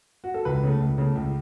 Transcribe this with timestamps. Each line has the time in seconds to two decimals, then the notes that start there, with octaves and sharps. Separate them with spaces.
0.24 F#4
0.34 A4
0.45 C#2 B4
0.63 C#3 A3
0.80 C#2
0.98 C#3 A3
1.15 C#2